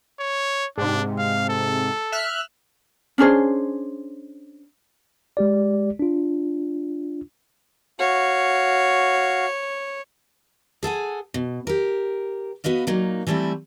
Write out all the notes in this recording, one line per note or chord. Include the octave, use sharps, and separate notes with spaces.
C#5
G#2 C3 D4
F5
A4
E5 F6 F#6
C#4 D4 G#4 C5
G#3 G4 D5
D4 F4
F#4 C#5 F5
G#4 A4 F#5 G#5
B2
G4 A#4
B3 F#4 B4 D#5 F5
A#2 F#3 A#3 D#4
E3 G3 A3 C4 E4